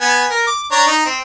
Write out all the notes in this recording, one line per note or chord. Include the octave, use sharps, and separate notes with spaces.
B3 G#5
A#4
D6
D4 C#5 A#5
D#4
C4